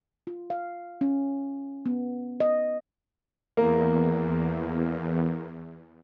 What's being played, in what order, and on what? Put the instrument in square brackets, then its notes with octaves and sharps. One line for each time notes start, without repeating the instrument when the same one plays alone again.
[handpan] F4
F5
C#4
B3
D#5
[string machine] E2 [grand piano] A#3 A#4